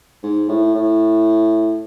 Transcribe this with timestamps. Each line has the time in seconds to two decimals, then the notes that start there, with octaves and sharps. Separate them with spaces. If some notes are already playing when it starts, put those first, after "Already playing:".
0.23 G#2
0.49 A2
0.74 A2